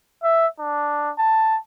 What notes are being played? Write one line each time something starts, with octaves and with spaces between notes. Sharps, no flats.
E5
D4
A5